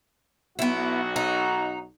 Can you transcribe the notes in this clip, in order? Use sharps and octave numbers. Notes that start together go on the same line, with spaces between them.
B1 B3 E4 F#4
D#4